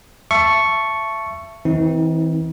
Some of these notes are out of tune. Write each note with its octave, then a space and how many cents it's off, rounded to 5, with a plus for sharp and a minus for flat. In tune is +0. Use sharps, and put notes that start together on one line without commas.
E5 +25 A5 +0 C#6 +0
E3 -30 C4 +0 D#4 +40